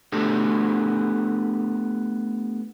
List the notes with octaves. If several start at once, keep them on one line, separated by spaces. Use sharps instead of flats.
A3 B3 D4 G4 A4